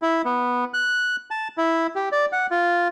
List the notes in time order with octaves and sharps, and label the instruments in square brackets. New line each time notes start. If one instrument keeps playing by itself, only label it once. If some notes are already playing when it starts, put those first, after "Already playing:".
[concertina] E4
B3
F#6
A5
E4
G4
D5
F#5
F4